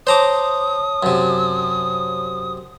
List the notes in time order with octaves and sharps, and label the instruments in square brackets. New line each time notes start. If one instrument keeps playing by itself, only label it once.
[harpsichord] C5 A#5 D6 [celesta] C#5 A5 [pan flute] D#6
[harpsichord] F#2 C3